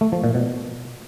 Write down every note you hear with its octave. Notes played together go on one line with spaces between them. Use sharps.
A3
F3
A#2
B2